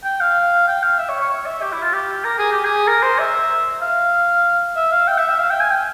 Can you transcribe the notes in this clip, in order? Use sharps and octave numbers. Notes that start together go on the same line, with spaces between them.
G5
F5
G5
F5
E5
C#5
C#5
C#5
E5
G4
E4
F4
G4
A#4
G#4
G4
G#4
A#4
C5
E5
F5
E5
F5
G5
E5
E5
F5
G5
G#5
G5